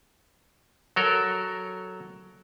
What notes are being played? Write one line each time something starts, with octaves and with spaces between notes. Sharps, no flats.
F#3 A4 A#4